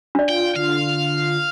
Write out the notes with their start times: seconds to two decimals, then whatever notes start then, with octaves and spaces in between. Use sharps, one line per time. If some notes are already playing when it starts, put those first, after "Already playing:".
0.15 D4 D5
0.29 F4 G5
0.56 D3 F4 F5